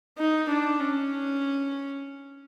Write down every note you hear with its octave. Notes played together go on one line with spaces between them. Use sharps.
D#4
D4
C#4